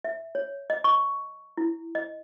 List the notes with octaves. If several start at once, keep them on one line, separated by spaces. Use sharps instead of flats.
E5
C#5
D#5
C#6
E4
D#5